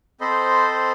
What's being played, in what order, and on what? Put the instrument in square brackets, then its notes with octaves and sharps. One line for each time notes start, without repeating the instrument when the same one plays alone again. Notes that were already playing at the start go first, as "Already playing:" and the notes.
[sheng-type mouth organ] C4 A4 C5 D#5 B5 C6